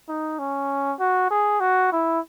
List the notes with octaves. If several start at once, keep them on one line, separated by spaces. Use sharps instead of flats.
D#4
C#4
F#4
G#4
F#4
E4